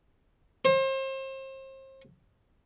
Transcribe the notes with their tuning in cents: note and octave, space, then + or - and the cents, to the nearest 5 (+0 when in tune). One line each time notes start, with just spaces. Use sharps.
C5 +35